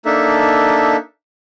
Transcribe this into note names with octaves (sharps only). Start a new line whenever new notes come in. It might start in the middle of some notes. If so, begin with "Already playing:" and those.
A#3 D4 D#4 A4 E5